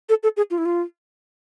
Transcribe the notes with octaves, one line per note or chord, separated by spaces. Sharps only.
A4
A4
G#4
F4
E4
F4